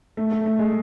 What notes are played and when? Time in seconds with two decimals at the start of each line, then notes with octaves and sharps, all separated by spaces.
0.17 A3
0.32 A3
0.46 A3
0.59 G#3